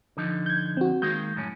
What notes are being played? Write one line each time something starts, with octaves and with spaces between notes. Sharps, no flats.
D3 F3 D#4
G6 G#6
C4 F#4
D#3 G#3 A#3 G6
F#2 A2 C#4